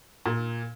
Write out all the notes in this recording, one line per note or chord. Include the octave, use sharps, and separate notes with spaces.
A#2